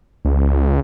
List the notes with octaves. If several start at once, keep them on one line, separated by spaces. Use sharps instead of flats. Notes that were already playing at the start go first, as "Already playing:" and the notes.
C#2